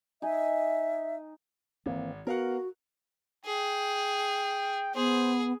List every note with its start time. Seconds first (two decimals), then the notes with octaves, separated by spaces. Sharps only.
0.22 D#4 D#5 E5 G#5
1.86 G#1 E3 A#3 C4
2.27 B3 F#4 A#4 F5 F#5
3.45 G#4 G5
4.95 B3 G#4 C5